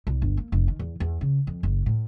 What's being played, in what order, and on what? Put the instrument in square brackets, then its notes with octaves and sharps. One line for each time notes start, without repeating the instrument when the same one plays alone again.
[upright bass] C2
G1
A#3
F1
D#3
E2
E2
C#3
F2
F#1
A2